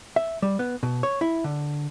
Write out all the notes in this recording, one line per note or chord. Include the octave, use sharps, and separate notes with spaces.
E5
G3
B3
B2
C#5
E4
D3